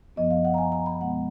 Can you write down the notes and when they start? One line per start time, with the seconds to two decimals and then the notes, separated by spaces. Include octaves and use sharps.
0.16 F#2 F3 B3 D#5
0.31 F5
0.45 F#5
0.54 A#5
0.58 G#5
0.72 A#5
0.86 B5
1.00 B2 G#3 B3 F#5